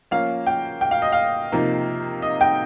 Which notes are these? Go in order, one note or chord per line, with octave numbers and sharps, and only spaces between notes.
F3 A#3 C#4 F5
G5
G5
F5
D#5
F5
C3 F3 A#3 D#4
D#5
G5